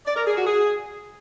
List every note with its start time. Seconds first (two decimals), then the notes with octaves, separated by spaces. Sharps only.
0.06 D5
0.16 A#4
0.26 G#4
0.36 F#4
0.46 G#4